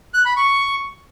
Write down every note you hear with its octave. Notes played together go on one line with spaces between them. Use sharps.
F#6
B5
C#6